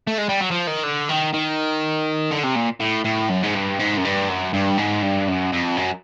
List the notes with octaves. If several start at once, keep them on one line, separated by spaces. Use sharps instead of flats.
A3
G#3
G3
F#3
F3
D#3
D3
D#3
D#3
D3
C3
A#2
A2
A2
F#2
G#2
G2
G#2
F#2
G2
F#2
G2
G#2
G2
F#2
F2
F#2